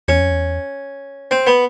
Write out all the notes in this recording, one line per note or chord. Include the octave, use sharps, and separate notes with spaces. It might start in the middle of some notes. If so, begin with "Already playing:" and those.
E2 C#4
F2
E2
C4
B3